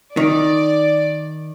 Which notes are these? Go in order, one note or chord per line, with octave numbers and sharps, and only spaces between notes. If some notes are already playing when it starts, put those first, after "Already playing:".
D#3 D5